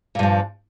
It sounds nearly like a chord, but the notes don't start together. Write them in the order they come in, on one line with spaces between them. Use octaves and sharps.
A#2 G2 F3